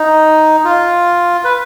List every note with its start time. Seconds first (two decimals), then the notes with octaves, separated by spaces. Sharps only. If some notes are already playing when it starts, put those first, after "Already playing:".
Already playing: D#4
0.65 F4
1.44 B4